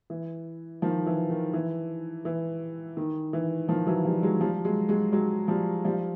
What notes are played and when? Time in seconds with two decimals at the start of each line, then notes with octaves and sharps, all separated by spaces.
0.10 E3
0.82 D#3 F3
1.06 E3
1.30 D#3
1.53 E3
2.25 E3
2.97 D#3
3.33 E3
3.69 D#3 F3
3.86 E3 F#3
4.05 F3 G3
4.23 F#3 G#3
4.41 F3 G3
4.65 F#3 G#3
4.89 F#3 G#3
5.12 F#3 G#3
5.48 F3 G3
5.85 F3 G3